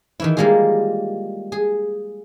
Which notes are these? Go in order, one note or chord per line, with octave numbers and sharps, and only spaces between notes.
D#3 E3 E4
G3 G#3 A#3 F4 G#4
G#4